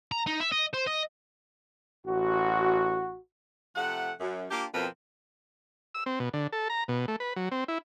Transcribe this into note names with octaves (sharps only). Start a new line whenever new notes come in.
A#5
D#4
E5
D#5
C5
D#5
A1 F#4
C3 F3 A3 F#5
F#2
A#3 D4 F4 G4
F2 B2 F3 C4 A#4 B4
E6
C4
B2
D3
A4
A#5
B2
A3
B4
F#3
C4
E4